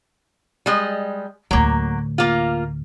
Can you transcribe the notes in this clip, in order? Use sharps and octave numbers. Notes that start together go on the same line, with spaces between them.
G3 G#3 D#5
D2 A2 F#3 A#3
A#3 F4